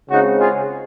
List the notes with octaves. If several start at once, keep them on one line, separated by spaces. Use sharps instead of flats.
C#3 G#3 C4 D#4 F#4
F4 G#4